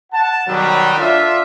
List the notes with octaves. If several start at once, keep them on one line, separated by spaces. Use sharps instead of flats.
F#5 A5
B2 D#3 F#3 G3
D3 D4 F4 E5